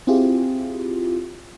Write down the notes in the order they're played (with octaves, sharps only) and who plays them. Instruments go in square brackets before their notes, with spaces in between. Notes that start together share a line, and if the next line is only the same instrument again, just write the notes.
[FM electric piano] C4 E4 F4 G4 G#4